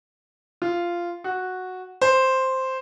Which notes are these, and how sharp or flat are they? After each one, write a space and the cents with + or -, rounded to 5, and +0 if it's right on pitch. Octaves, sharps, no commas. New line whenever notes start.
F4 -10
F#4 -5
C5 +0